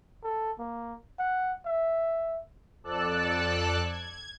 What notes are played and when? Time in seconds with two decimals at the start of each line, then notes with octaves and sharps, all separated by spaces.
0.24 A4
0.58 A#3
1.19 F#5
1.66 E5
2.84 F2 A4 D5 A5 E6 F#6
3.84 G#6